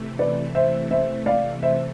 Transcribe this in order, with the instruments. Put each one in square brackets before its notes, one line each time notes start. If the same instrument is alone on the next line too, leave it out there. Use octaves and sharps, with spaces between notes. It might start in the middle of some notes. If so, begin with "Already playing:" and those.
Already playing: [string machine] C3 E3 A3
[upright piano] B4 D5
C5 E5
C5 E5
D5 F5
C5 E5